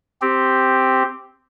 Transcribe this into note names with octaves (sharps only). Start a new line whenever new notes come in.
C4 G4